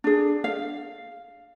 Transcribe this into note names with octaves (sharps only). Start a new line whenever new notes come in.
D4 G#4
F5